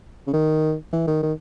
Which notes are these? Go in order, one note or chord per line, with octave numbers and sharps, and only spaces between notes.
C#3
D#3
E3
D#3
D#3